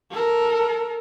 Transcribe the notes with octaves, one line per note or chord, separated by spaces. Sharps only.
A4 A#4